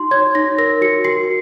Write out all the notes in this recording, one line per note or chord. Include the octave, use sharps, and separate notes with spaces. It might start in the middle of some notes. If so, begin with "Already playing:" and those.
Already playing: D#4 F#4 C6
C#5 G#6
D#4 A#6
A#4 A#6
F#4 C#7
F#4 C7